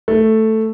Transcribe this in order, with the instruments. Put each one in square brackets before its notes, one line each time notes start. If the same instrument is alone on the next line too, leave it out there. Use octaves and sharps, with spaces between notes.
[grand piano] A3